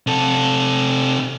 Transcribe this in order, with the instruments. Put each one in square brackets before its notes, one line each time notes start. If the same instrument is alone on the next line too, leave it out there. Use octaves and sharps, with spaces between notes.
[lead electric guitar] C3 A4